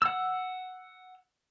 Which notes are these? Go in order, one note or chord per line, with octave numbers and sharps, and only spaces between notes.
F#5 E6